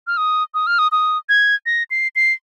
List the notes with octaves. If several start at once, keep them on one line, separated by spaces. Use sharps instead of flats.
F6
D#6
D#6
F6
D#6
D#6
G#6
A#6
C7
C7